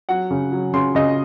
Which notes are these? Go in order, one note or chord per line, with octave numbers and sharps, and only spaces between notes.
F#3 F#5
C#3
F#3
C#3 C6
C#3 D#5